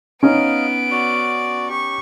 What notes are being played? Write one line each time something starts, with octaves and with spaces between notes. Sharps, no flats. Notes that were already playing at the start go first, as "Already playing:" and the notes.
B3 C#4 D#4 D#5 F5 D7
F#4 D5
G4 C#6